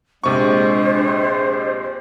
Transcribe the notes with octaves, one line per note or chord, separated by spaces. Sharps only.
A#1 C3 G#3 D4 C5 C#6